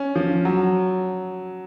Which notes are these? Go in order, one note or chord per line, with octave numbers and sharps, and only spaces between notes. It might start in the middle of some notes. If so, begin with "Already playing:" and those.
Already playing: C#4
F3
F#3